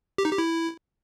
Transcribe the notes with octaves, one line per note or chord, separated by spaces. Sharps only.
G4
D#4
G4
E4